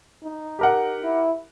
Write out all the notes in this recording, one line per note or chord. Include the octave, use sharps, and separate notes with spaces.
D#4
G4 A#4 F#5
E4